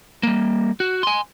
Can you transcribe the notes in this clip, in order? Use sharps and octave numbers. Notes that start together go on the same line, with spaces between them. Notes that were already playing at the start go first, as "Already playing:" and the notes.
G3 A#3
F#4
G#5 C6